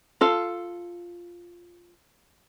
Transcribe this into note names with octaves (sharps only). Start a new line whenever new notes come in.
F4 A4 F5